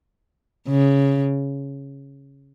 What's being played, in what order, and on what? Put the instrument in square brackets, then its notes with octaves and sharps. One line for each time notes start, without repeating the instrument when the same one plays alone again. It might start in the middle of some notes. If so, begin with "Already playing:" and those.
[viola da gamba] C#3